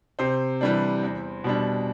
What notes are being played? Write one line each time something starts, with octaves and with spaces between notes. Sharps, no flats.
C3 C5
E3 G3 D4
E2
B2 G3 D4